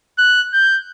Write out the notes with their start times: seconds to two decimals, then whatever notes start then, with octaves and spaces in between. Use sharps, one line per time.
0.19 F#6
0.53 G6